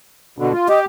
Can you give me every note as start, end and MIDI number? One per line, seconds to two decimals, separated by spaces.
0.38 0.53 47
0.38 0.53 50
0.53 0.67 65
0.68 0.85 67
0.68 0.79 75